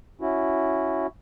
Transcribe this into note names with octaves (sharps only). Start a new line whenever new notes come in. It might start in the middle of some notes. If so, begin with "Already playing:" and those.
C#4 E4 F#4